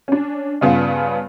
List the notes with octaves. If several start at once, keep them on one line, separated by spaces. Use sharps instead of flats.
C#4 D4
G2 C#3 B3 F4